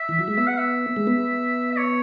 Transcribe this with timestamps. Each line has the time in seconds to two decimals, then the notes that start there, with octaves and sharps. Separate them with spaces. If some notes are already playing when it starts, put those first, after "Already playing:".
Already playing: E5
0.09 E3
0.19 F#3
0.28 G#3
0.37 B3 E5
0.47 F#5
0.57 E5
0.96 G#3
1.07 B3
1.72 E5
1.77 C#5